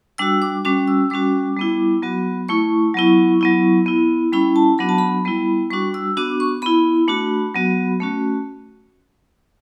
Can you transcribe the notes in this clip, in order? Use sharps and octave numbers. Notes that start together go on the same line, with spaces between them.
G3 D4 F#4 E6
D6
G3 C#4 F#4 D6
E6
G3 C#4 F#4 D6
G3 B3 E4
F#3 B3 F#4
A3 E4 C#6
F#3 B3 E4
F#3 B3 E4
B3 E4
G3 C#4 E4 B5
A5
F#3 B3 D4 F#4 B5
A5
B5
G3 B3 E4
G3 D4 F#4 C#6
E6
B3 D4 F#4 D6
C#6
B3 E4 B5
A3 D4 F#4
F#3 B3 F#4
A3 C#4 F#4